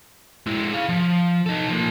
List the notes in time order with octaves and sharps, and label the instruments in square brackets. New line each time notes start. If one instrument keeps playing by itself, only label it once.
[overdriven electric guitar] G#3 E4
G#4 F5
F3
D#4 A4
F3 A#3